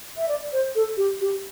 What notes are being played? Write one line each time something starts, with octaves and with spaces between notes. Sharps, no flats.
E5
D5
C5
A4
G4
G4